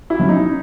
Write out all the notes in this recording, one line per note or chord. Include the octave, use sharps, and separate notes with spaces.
E4
F#3 A3 C#4
D#4